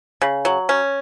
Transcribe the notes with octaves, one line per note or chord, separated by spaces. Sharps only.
C#3
F#3
C#4